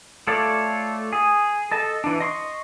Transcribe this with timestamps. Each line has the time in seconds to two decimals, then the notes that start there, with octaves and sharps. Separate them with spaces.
0.27 A3 F4 A4 C#5 D5
1.13 G#4
1.71 A4 D#5 A5
2.04 E3 D4
2.20 D#5 C6 C#6